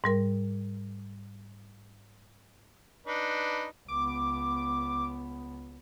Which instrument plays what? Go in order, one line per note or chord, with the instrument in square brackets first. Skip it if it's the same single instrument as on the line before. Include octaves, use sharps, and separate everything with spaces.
[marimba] G#2 G3 A#4
[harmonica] D4 D#4 B4
[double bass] C#2 B3 [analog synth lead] D6